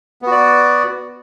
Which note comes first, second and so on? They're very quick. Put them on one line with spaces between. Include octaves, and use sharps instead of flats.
B3 F#4 D5